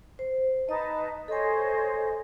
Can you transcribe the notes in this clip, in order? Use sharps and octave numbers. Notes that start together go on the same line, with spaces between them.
C5
D#4 B4 D#5 A5
A4 C5 C#5 D#5 G#5